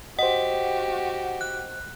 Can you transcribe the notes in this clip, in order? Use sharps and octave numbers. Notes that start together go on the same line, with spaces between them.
F#4 G4 C5 D#5 F#5
F#6